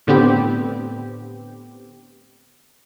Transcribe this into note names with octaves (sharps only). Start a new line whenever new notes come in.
A2 D3 B3 C4 G4